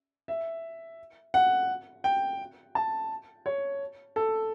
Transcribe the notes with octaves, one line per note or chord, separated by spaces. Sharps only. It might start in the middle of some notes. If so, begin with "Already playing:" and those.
E5
F#5
G5
A5
C#5
A4